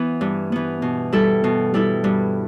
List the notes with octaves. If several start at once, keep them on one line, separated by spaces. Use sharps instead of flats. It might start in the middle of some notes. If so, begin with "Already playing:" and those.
Already playing: E3 B3
G2
E3 B3
B2
G3 E4 A4
B2
G3 E4 A4
G2